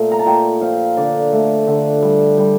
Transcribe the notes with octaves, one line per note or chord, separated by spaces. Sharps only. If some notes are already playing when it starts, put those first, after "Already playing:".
Already playing: A#2 A3
A#5
A5
A#2 G5
F3 F5
D3 D5
A3
D3
G3
G3